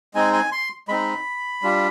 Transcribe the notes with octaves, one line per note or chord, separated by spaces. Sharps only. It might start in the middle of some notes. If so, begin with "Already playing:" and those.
G#3 C4 D#4 G#5
G#5
C6
G#3 C4 D#4 B5
G3 D4 F4